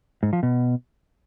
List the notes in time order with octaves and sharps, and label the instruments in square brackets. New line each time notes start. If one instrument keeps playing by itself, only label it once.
[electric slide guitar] G#2
F3
B2